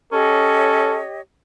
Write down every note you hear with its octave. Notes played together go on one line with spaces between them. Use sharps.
C#4 G4 A4 C#5 D#5